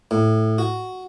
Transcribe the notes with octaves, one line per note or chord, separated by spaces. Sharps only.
A2
F#4